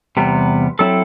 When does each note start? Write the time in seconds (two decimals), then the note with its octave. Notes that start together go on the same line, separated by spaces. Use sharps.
0.17 E2 C3 G3 B3
0.79 F#3 C4 E4 A4